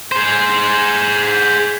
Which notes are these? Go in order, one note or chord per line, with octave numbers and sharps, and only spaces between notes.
G#4 C5